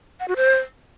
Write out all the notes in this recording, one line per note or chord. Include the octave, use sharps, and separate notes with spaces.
F#5
F#4
C5